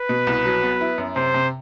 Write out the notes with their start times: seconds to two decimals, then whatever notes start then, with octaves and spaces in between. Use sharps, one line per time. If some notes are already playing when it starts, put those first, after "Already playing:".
Already playing: B4
0.09 B2
0.27 C2
0.46 F#3
0.63 B3
0.81 E4
0.98 F#2
1.16 C3 C5
1.34 C3